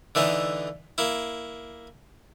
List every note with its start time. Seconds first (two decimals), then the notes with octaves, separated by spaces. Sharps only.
0.15 D3 E3 A3 D#4
0.98 A#3 E4